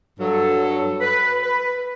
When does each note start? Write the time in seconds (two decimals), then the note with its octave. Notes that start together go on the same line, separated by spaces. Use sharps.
0.19 G2 F#3 A4
1.01 B4
1.42 B4